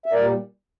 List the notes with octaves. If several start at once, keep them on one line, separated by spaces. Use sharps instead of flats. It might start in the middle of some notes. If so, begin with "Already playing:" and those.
E5
A#2 G3 A#4 D5